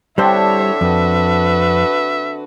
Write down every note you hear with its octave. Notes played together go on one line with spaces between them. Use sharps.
D3 G3 C4 D4 E4 C5 C#5 E5
F2 F#4 B4